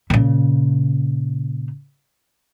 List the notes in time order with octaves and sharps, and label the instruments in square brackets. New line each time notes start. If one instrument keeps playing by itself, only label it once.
[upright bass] A#2 C#3